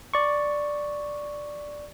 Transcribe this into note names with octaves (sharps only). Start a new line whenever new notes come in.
D5 C#6